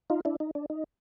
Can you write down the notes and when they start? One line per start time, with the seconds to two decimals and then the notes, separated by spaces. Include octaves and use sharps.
0.10 D#4 F4
0.25 D4 E4
0.40 D#4
0.55 D4
0.70 D#4